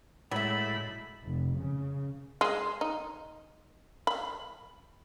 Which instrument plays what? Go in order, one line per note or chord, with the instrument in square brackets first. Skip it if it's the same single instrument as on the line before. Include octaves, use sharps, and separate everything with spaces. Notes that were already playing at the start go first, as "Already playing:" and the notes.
[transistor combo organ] A2 E4 [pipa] F#3 E5 [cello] G#3 [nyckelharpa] B5
[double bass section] F1
C#3
[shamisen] G#3
D#4
B5